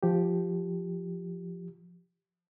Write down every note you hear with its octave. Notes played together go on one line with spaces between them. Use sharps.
F3 G4